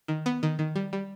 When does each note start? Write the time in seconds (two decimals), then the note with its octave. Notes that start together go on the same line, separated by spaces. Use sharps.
0.08 D#3
0.26 B3
0.43 D#3
0.59 D#3
0.76 G3
0.93 G3